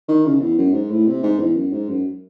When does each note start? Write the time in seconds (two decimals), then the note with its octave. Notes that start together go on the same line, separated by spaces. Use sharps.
0.08 D#3
0.26 C#3
0.42 E2
0.58 F#2
0.74 G#2
0.91 A2
1.07 C3
1.23 G#2
1.40 E2
1.56 F#2
1.73 G#2
1.89 F#2